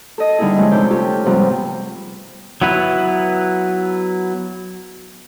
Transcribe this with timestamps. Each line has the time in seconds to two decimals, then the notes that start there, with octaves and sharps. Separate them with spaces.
0.18 A4 D#5
0.38 D3 G3 B3 D#4 E4 G#4
0.58 F3 G#3 A3 C#4 F4
0.72 C3 D#4 D5 G6
0.90 C#4 F4 G4 A4
1.26 G#2 C3 F3 G3 B3
2.62 F#3 B3 E4 B4